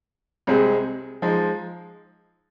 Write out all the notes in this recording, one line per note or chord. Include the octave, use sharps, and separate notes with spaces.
C2 C3 G#3 C4 G#4
F3 G#3 D#4